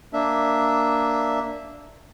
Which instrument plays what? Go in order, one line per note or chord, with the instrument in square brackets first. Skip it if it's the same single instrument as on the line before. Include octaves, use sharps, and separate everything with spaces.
[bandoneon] A#3 D4 E5